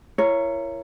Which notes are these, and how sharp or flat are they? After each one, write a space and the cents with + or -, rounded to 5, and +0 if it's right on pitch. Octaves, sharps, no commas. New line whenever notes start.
E4 +35 A#4 -5 C#5 +0